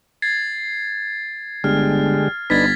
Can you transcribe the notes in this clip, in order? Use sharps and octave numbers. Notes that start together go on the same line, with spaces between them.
G#6 A6 C7
G1 D3 G#3 G4 F6
G1 D4 D#4 B4 G#6 A6 B6